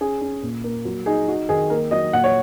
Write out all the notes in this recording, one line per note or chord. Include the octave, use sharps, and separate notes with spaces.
C#4 G#4
C#4
A#2
A#3
F#3
D#4 G#4
D#4 F#4
D#3 G#4
A#3 A#4
F#3 D#5
A#2 F#5
C#5